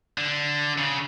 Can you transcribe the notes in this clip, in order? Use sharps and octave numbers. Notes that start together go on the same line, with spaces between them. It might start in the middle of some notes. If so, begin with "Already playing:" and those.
D3
C#3